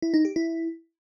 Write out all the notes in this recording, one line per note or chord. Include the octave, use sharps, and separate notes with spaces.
E4
D#4
G4
E4